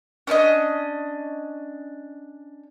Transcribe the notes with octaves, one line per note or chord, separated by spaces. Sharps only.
C#4 D4 D5 D#5